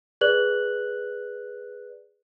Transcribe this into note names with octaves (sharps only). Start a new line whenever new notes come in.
G#4 B4 D5 F#6 F#7